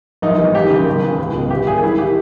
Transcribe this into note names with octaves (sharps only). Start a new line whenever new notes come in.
A#1 D#4
E3
G#2
E1 G4
D#2 C#3
D#2
C#3 E3
C#2
B2
G1 G4
G2 D#3 G#4
G1 E4
D#3 G4